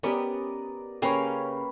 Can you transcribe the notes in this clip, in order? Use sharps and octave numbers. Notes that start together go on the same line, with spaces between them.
B3 C#4 G4 A#4 D5 D#5
C#3 A#3 C#4 G4 B4 C#5 F5